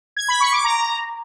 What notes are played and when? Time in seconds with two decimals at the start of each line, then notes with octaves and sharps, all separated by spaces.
0.17 G#6
0.28 B5
0.40 C#6
0.52 D6
0.64 A#5